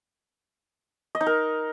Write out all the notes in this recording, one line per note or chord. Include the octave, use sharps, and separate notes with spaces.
D#5
D#4
A#4